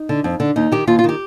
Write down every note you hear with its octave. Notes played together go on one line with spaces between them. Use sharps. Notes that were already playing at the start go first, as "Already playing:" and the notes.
Already playing: D#4
D3
F2
D3
D#2 D#4
D#3 G4
D#2 F4
F4
D#3 G4